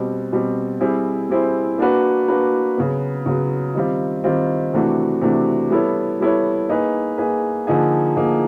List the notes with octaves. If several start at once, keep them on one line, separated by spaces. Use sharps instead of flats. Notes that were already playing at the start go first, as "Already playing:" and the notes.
Already playing: B2 G3 C4
B2 G3 C4
G3 C4 E4 G#4 C5
G3 C4 E4 G#4 C5
A#3 D4 F#4 B4
A#3 D4 F#4 B4
C#3 F#3 B3
C#3 F#3 B3
D#3 G3 C4 F4
D#3 G3 C4 F4
C3 E3 A3 D4 F#4
C3 E3 A3 D4 F#4
G3 B3 E4 A4 C#5
G3 B3 E4 A4 C#5
A#3 D#4 G#4 B4
A#3 D#4 G#4 B4
D3 F3 A#3 D#4 G#4
D3 F3 A#3 D#4 G#4